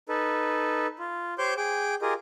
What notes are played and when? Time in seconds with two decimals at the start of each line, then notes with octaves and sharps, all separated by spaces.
0.09 D#4 A4 B4
0.99 F4
1.38 G4 C5 C#5 C6 D6 G6
1.57 G#4 G5 D6
2.02 F4 G4 G#4 A#4 D#5